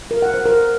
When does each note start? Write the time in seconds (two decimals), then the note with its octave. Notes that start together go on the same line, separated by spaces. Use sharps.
0.11 A#4
0.22 F#5
0.34 C5
0.46 A#4